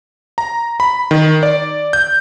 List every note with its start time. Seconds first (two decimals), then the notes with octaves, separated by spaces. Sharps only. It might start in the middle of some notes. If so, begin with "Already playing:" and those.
0.38 A#5
0.80 B5
1.11 D#3
1.43 D5
1.93 G6